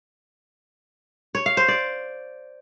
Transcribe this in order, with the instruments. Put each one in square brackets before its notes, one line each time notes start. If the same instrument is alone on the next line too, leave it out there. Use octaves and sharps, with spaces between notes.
[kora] C#5
F5
C5
D5